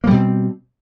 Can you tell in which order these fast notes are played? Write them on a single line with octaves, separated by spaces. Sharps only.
A#3 G3 B2 C4